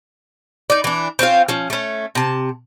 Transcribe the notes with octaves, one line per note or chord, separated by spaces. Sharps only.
D#4 D5
E3 D4
C4 C#4 F4 F5
F3 C#4
A3 C#4
C3 A5